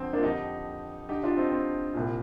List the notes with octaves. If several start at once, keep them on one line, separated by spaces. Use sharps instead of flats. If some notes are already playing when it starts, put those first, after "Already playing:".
Already playing: F2 D3 C4
A#3 D4
F4
F2 D3 D#4 G4
G2 D3 D#4 G4
D4 F4
C4 D#4
C4
C2 A#2